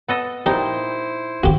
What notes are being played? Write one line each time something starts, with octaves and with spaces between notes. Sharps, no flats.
B3 A4 D#5
A#2 D#4 E4 G4 C5
G2 D#3 F#4 G4